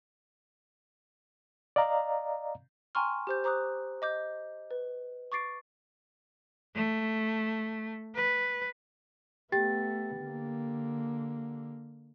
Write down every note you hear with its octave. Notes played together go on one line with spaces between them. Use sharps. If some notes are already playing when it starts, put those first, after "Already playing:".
D5 D#5 F5 A#5
G5 G#5 A#5 C6 C#6 F6
G4 C5 G6
C5 A#5 D6 D#6 F#6
D#5 D6 G6
B4
C#6 D6 A6 C7 D7
A3
B4
A3 B3 G4 G5 A6
D3 A#3